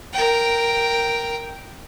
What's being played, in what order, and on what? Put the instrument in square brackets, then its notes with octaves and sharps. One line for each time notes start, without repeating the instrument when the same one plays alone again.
[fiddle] A#4 G5